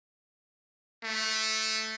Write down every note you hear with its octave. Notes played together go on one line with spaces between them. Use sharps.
A3